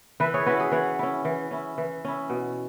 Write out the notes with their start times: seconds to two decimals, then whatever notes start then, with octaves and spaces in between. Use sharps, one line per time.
0.20 E3 B4 E5
0.34 G#4 C#5
0.46 C#4 E4 F#4 B4
0.60 G#4
0.72 E3 C#5 F#5
0.99 C#4 E4
1.25 E3
1.51 C#4 E4
1.78 E3
2.05 C#4 E4
2.30 B2